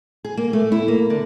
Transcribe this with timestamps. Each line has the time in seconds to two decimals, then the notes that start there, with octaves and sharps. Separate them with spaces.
0.25 G#4
0.37 A#3
0.53 A3
0.72 E4
0.88 A#3
1.10 D3